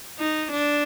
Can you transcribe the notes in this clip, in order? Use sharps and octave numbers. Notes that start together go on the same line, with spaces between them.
D#4
D4